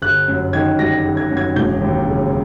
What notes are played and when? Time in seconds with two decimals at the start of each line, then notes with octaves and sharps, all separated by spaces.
0.02 G1 F#6
0.28 F#2
0.53 D#3 G#6
0.79 G3 A#6
1.05 G1
1.17 G#6
1.31 F#2
1.37 G#6
1.56 E1 G6
1.81 D#2
2.07 C#3